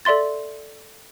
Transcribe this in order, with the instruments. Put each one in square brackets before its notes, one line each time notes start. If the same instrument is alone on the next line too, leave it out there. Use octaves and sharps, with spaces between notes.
[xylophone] A4 D5 E5 C6 A6